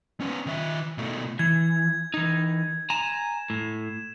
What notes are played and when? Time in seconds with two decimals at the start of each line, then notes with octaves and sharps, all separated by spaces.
0.21 B3 C#4
0.46 D#3 E5
0.98 B2 A3
1.39 E3 G#6
2.14 E3 D#4
2.90 G#5 A#5 E7
3.50 A2